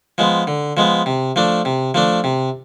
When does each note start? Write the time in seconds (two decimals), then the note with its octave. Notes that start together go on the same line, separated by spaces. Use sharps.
0.18 F3 G#3 B3
0.47 D3
0.77 F3 G#3 B3
1.06 C3
1.36 F3 A3 D4
1.65 C3
1.94 F3 A3 D4
2.24 C3